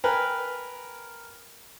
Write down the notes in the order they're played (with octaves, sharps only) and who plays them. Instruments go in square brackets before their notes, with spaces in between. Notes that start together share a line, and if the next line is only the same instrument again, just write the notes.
[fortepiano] A#4 B4 G5 G#5